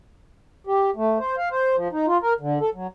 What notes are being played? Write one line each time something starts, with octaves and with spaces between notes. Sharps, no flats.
G4
A3
C5
F5
C5
F3
D#4
F4
A#4
D3
A4
F#3